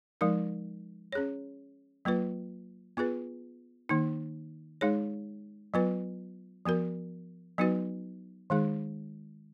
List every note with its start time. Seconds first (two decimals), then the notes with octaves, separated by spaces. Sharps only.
0.21 F3 G#3 D#4 A#4
1.12 C#4 G#4 C#5
2.05 F#3 A#3 F4 B4
2.97 B3 F4 G#4 B4
3.89 D#3 A#3 D#4
4.81 G#3 D#4 G#4 C#5
5.74 F#3 B3 F4 B4
6.65 F3 B3 F#4 A#4
7.58 F#3 B3 D#4 F#4 B4
8.50 D#3 G#3 D#4 G#4